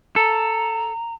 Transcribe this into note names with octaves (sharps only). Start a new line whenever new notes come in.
A4 A#5